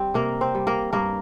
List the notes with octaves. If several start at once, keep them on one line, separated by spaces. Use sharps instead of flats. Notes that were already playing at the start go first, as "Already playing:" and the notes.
Already playing: G3 C4
C3 A#3 A#4
C4 C5
G3
A#3 A#4
G2 A#3 A#4